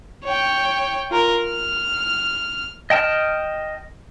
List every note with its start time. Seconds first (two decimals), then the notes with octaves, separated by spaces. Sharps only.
0.24 C#5 G5
1.11 F4 A#4
1.44 F6
2.90 D#5 G5 A5 F6